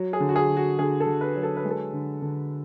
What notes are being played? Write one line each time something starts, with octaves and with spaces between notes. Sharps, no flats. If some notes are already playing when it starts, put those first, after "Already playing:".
Already playing: F#3
G#4
D3
F#4
G#4
D3
F#4
D3 G#4
A4
D3
B4
F#3
A4
B4
G#3
A4
D3
D3